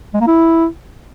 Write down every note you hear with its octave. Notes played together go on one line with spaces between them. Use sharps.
G#3
A#3
E4